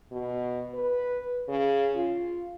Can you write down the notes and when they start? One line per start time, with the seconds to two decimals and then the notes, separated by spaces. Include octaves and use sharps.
0.12 B2
0.75 B4
1.49 C#3
1.96 F4